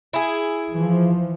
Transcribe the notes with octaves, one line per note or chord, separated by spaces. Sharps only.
E4 G#4
E3 F3